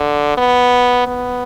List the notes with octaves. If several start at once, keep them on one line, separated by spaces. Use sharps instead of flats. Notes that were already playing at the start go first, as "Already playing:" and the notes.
Already playing: D3
B3
B3